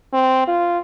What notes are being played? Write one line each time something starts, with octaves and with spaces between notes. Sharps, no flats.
C4
F4